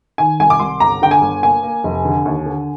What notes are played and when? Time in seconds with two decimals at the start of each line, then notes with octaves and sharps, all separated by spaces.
0.18 D#3 G#5
0.40 C2 G#5
0.50 D6
0.59 C2 C6
0.80 G1 A#5
1.02 D3 G5
1.11 G#5
1.21 G1
1.43 A#3 G#5
1.63 A#3
1.84 F1
2.05 D3
2.25 D#2
2.46 D3